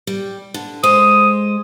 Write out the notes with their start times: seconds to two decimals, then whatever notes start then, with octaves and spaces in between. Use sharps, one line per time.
0.07 G3
0.54 D3
0.84 G#3 C5 D#6